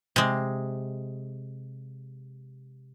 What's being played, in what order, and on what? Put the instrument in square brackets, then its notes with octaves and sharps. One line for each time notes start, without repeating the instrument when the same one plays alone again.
[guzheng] C3 G#3